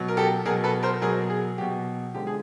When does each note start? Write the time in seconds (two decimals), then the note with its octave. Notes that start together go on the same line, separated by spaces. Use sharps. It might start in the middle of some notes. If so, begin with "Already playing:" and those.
Already playing: B2 F#3
0.08 A#4
0.17 G4 A4
0.45 B2 G#4 A#4
0.49 F#3
0.64 A4 B4
0.83 A#4 C5
1.01 B2 F#3 G#4 A#4
1.30 G#4
1.58 B2 F#3 G4
2.14 D3 F3 G#3 G4
2.27 G#4